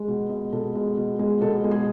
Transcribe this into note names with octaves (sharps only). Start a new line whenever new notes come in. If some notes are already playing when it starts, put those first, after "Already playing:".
Already playing: G#3
B2
G#3
B2 A4
G#3
B2
G#3
B2 A4
G#3
G#4